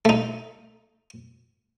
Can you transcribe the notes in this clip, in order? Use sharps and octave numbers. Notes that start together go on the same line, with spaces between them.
A3 D#4